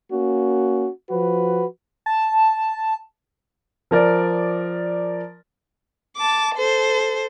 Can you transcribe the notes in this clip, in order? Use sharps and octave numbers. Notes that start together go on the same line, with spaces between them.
A#3 C#4 F#4
F3 F#4 B4
A5
F3 A#4 D5
A5 D6
A4 C5